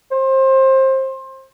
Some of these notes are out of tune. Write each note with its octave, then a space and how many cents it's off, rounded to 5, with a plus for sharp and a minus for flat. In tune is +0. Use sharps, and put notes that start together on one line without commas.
C5 +25